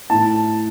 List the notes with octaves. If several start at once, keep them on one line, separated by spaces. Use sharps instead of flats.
A2 A5